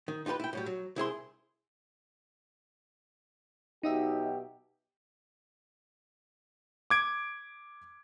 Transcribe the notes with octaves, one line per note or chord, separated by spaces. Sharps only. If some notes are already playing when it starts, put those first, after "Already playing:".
D#3
D#4 F4 G4 A#4 B4
E4 G5
A2 F#3 G3
F#3
C2 E4 G#4 C6
B2 F#3 D#4 G4 D#5 E5
D6 G#6 D7